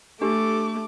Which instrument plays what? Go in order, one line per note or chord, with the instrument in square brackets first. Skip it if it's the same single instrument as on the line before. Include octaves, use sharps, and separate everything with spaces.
[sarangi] A3 [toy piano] D4 G4 [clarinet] A4 [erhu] D6